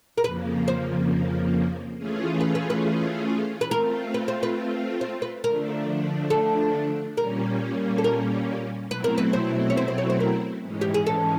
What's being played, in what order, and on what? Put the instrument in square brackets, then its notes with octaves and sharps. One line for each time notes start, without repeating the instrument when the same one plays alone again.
[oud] A#4
[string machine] F2 C#3 F3 A#3 [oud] B4
[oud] C5
[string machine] E3 A3 C#4 F4 G#4
[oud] B4
B4
B4
B4
[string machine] A3 C4 F4 [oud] A#4
[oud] B4
C5
B4
C5
B4
[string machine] D3 F3 A3 D4 [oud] A#4
[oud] A4
[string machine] A#2 G3 A#3 C#4 [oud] A#4
[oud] A4
A#4
[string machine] B2 F#3 A3 C4 E4 [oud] B4
[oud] A#4
B4
C5
C#5
C5
C5
C#5
C5
A#4
[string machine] G#2 E3 G#3 C#4
[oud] G4
G#4
A4